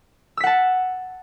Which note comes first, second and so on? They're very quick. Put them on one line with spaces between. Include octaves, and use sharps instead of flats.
E6 B6 F#5 A5